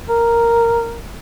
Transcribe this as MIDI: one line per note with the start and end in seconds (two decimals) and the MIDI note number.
0.09 0.97 70